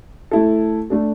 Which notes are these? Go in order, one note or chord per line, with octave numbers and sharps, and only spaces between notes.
A3 E4 A4
A3 D4 A4